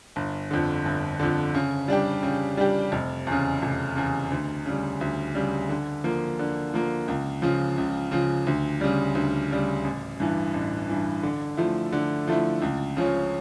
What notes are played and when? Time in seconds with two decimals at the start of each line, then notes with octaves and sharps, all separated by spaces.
0.16 G1
0.51 F2 D3
0.85 G1
1.20 F2 D3
1.54 C#3
1.88 G3 D4 G4
2.23 C#3
2.57 G3 D4 G4
2.92 F1
3.27 E2 C#3
3.62 F1
3.96 E2 C#3
4.32 D2
4.65 C#3 G3
5.01 D2
5.35 C#3 G3
5.69 D3
6.04 F3 A#3
6.39 D3
6.74 F3 A#3
7.08 C#2
7.42 C#3 F3
7.78 C#2
8.11 C#3 F3
8.47 D2
8.81 C#3 G3
9.15 D2
9.51 C#3 G3
9.84 A1
10.20 G2 E3
10.54 A1
10.89 G2 E3
11.23 D3
11.57 F3 A3 E4
11.92 D3
12.28 F3 A3 E4
12.62 C#2
12.97 C#3 F3 C#4